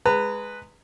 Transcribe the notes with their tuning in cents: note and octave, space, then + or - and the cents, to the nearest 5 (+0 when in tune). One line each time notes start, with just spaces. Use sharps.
G#3 +0 B4 +0 A#5 -30